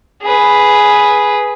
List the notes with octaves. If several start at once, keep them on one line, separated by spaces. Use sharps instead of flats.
G#4 B4